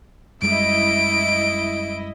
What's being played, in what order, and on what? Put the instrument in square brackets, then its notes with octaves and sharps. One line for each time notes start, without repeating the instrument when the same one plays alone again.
[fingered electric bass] F#2 G3 G#3 [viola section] E4 D#5 [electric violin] D7